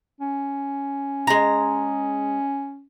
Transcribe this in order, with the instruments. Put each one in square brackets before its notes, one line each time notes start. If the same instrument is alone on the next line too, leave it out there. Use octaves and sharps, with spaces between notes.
[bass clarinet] C#4
[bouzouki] G#3 A#5